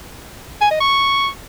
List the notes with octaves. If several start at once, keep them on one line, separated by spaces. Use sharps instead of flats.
G#5
D#5
C#6